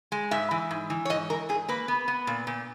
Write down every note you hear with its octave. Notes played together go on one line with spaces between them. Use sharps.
G#3
G#2 E5
E3
G#2
E3
C#5
G#2 D#5
E3 A#4
G#2 G#4
A#3 B4
B3
B3
A#2
A#2